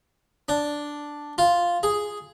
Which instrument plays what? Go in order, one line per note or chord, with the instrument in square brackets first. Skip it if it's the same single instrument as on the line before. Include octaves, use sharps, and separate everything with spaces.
[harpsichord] D4
F4
G#4